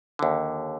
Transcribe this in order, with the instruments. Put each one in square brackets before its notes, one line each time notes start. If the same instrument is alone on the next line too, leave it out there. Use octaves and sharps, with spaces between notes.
[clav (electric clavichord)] D#2 D3